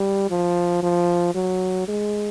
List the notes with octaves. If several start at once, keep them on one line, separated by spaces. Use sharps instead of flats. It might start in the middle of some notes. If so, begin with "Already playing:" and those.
Already playing: G3
F3
F3
F#3
G#3